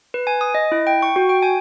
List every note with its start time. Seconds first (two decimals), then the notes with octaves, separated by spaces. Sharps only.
0.14 B4
0.27 G#5
0.41 D#6
0.55 D#5
0.72 E4
0.87 G5
1.02 C#6
1.16 F#4
1.29 G5
1.43 G#5